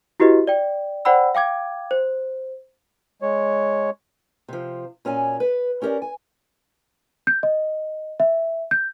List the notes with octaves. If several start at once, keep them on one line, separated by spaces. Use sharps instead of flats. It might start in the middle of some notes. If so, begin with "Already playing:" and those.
E4 F#4 G4 B4 D#5
D5 G5
C5 D5 F#5 G5 B5 E6
F5 G5 D6 G#6
C5
G#3 C#5
C3 F3
A#2 C#4 F#4 G#5
B4
C#4 G4 A#4 B4 D5
G#5
G6
D#5
E5
G6